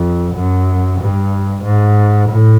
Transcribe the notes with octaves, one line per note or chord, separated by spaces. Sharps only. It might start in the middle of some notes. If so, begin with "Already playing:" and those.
Already playing: F2
F#2
G2
G#2
A2